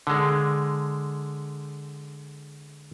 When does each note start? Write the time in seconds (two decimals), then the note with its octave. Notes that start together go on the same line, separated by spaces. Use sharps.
0.07 D3 G#3